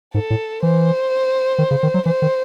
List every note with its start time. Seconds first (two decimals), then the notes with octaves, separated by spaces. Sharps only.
0.14 G#2 A4
0.30 A2
0.63 E3 C5
1.58 D#3
1.71 C#3
1.83 D#3
1.94 F#3
2.06 E3 C5
2.22 D#3